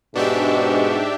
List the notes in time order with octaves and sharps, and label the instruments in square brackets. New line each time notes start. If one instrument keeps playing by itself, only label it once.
[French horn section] G#2 [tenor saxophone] B2 [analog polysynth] D4 G4 E5